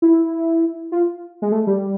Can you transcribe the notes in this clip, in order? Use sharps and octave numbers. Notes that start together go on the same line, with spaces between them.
E4
F4
G#3
A3
G3